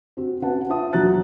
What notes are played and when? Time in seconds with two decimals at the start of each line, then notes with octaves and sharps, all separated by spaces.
0.17 C4 F#4
0.42 C#4 F#4 B4 F#5 A5
0.69 F4 E5 A5 D#6
0.93 E1 F#3 F#4 A#5 F#6 A6